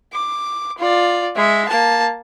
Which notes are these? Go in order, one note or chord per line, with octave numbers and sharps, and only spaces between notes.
D6
F4 D5
G#3 E5
A#3 A5